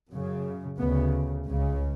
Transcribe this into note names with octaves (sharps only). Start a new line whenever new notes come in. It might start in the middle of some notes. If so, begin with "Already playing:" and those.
F#2 C#3
D2 C#3 B3
C#2 C#3